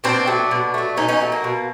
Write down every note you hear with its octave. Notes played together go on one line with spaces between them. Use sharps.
B2 C4 D4
F#3 A3
B2
F#3 A3
B2 C#4 D#4
C#4 D#4
F#3 A3
A#3
B2